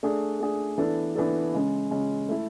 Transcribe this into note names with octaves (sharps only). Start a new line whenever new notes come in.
A3 D4 G#4
A3 D4 G#4
E3 B3 D4 A4
E3 B3 D4 A4
C#3 G#3 C#4
C#3 G#3 C#4
A3 E4 A4